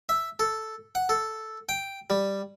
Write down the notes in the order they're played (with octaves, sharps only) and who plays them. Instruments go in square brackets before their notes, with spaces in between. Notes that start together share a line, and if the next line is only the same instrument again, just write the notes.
[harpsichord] E5
A4
F#5
A4
G5
G3